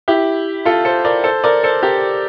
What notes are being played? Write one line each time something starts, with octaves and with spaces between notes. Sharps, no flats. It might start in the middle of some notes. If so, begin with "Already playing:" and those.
E4 G4
F4 A4
A4 C5
A#4 D5
A4 C5
A#4 D5
A4 C5
G4 A#4